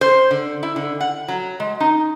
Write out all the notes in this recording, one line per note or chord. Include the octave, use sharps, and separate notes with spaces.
C5
D3
E4
D3
F#5
F#3
G#3
D#4